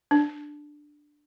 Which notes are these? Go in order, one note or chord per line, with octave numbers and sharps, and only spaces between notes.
D4